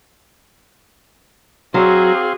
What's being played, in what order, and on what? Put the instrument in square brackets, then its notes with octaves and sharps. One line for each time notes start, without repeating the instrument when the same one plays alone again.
[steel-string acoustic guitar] F#3 [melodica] C4 F5 C6 [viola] F#4 G#4